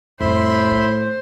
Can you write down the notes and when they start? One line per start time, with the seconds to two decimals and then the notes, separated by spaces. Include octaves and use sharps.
0.20 F2 A2 G3 C5 E5 B5 C6
0.71 E4